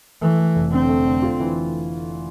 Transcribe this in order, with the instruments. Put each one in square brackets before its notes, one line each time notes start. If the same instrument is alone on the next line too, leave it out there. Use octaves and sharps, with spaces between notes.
[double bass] E3 [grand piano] A3
[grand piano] A3
F1
[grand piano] D3 [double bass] C4
[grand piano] A3
D3
F4
E3